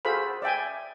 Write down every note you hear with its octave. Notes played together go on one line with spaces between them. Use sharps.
F#4 G#4 A4 C5 F5 B5
D5 E5 G5 G#5